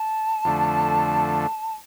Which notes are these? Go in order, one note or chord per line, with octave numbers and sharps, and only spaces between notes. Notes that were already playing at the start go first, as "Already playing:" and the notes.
Already playing: A5
F2 D3 A3